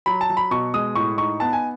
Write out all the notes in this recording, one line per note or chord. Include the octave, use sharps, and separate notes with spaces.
F#3 B5
A5
F#3
B5
B2 C#6
G#3 D#6
A2 C#6
D#4 C#6
B3 A5
G#5